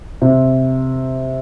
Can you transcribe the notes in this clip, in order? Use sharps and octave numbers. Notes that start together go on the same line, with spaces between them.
C3